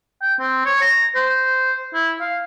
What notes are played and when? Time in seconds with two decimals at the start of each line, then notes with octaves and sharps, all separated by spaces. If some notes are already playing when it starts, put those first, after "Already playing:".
0.22 G5
0.39 C4
0.65 C#5
0.81 A#5
1.16 C5
1.94 E4
2.20 F5